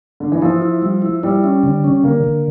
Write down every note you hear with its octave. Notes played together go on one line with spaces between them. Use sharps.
D3
E3
F3 E4
E4
G3
E4
G3 E4
C#4
D3
C#4
D3 A#3
D3